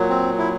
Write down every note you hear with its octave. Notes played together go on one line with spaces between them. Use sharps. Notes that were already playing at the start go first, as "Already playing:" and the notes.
Already playing: A#2 F#3
C4
E4